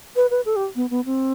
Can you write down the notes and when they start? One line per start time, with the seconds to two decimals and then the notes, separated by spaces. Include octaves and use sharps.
0.16 B4
0.31 B4
0.46 A4
0.56 G4
0.76 B3
0.90 B3
1.05 C4